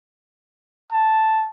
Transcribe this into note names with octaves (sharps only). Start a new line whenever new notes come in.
A5